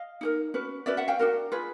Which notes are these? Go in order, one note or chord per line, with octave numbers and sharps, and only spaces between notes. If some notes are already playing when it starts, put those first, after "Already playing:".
Already playing: D#5 F5
D#4 G4 A#4
C#4 F#4 B4
C#4 F#4 B4 D5 E5
E5 F#5
F5 G5
D4 F#4 A#4
F4 G#4 B4